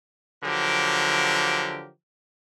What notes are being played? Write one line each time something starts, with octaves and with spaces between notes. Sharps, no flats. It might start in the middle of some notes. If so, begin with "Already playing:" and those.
D3 F3 F#3 G4 A#4